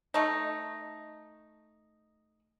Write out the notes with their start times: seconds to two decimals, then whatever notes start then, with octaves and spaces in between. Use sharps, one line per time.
0.14 A3 D#4